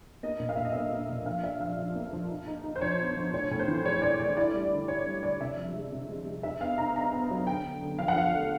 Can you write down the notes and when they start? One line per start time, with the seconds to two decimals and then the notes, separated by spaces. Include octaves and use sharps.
0.23 A#3 D#5
0.40 A#2
0.49 F5
0.56 A#2 E5
0.65 D#5
0.73 A#3 E5
0.92 A#3
1.09 A#2
1.26 F3 F5
1.43 D4 E5
1.60 F3 F5
1.79 F3
1.95 A#3
2.13 F3
2.30 D#4
2.47 D#4
2.64 D#4
2.76 C5
2.81 F3 C#5
2.99 B3
3.17 F3
3.33 A2 C#5
3.51 A2
3.59 C5
3.68 E3
3.85 G#3 C#5
4.02 A2 D5
4.19 A2 D5
4.37 E4 D5
4.54 G3
4.71 D3
4.88 E4 C#5
5.06 G3
5.23 D3 D5
5.40 C3 E5
5.57 F3
5.75 G#3
5.92 C3
6.09 G#3
6.26 G#3
6.43 D#4 E5
6.61 B3 F5
6.78 D#4 A#5
6.96 B3 A#5
7.13 B3
7.30 F#3
7.47 D3 G5
7.64 D3
7.82 D3
7.99 F3 F5
8.08 F#5
8.16 F3 F5
8.34 A3